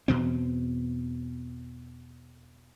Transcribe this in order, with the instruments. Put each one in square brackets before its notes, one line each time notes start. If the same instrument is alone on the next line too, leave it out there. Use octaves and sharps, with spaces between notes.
[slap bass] E2 B2 C4